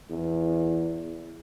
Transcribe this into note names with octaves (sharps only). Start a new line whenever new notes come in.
E2